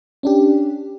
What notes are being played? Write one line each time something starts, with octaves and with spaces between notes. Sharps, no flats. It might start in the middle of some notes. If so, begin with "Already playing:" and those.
C#4 D4 G4